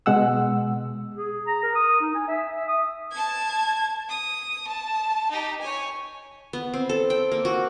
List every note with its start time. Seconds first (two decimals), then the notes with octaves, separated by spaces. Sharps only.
0.06 B2 G#3 F#5 E6
1.14 G#4
1.47 A#5
1.63 A#4
1.75 D#6
2.01 D#4
2.15 G#5
2.28 E5
2.56 E5
2.68 D#6
3.11 A5 G#6
4.09 D#6
4.67 A5
5.31 D#4 G4
5.61 C#5 G#5
6.53 B3
6.74 C4
6.89 A4
7.10 G5
7.32 A#3
7.45 F#4